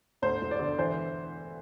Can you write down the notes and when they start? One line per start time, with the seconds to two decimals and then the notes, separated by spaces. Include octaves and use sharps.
0.22 D2 C5
0.42 E1
0.51 D5
0.60 D3
0.78 E3 C5